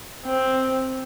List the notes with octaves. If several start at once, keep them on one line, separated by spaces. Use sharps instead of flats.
C4